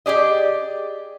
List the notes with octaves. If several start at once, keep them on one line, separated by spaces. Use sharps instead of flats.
G4 G#4 D5 D#5